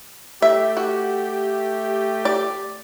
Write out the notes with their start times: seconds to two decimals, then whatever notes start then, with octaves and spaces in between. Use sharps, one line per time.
0.42 A3 G4 E5
0.77 F#4
2.25 D5